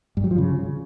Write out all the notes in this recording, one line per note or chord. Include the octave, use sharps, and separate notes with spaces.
G2
F#3
F3
C#3